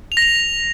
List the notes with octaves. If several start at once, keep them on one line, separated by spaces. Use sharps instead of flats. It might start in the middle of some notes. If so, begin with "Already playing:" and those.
F7
A#6
F7